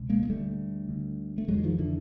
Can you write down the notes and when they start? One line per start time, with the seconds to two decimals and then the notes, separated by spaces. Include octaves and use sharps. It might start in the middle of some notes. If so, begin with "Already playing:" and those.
Already playing: C#2 B2
0.10 G#3 A#3
0.23 G#3
0.29 D2 D3 G3 A3
0.89 D2 D3
1.38 A3
1.48 F2 D3 F#3 G#3
1.58 E3
1.63 D#3 F3
1.78 D3 E3